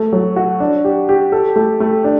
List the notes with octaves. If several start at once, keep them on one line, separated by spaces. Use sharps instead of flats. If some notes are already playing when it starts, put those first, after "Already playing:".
Already playing: A3
F#3
F#4
D4
G4
G4
A4
A3
A3
D4